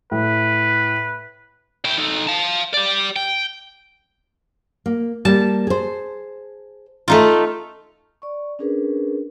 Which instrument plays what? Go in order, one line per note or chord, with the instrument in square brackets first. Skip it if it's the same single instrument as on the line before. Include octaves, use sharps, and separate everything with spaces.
[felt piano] A2 [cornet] B4
[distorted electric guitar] E4 G5
D#4 A4
F5 A5
G4 D5
G5
[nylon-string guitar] A#3
[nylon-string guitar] G3 A#3 [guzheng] A5
[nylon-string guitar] G#4 C5
[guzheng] A3 D#4 F4
[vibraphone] D5 C#6
C#4 D4 G#4 A#4 B4